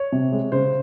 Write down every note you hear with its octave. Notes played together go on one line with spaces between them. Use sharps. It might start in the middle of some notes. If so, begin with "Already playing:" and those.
Already playing: C#5
C3
G#3
C#3 C5